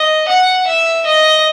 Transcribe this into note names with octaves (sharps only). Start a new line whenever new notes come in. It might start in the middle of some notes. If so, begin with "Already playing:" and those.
Already playing: D#5
F#5
E5
D#5